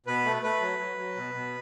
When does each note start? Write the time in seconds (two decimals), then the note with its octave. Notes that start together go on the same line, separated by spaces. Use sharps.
0.06 B2 B4
0.25 A3
0.42 A3 B4
0.61 F#3
0.79 F#3
0.97 F#3
1.16 B2
1.34 B2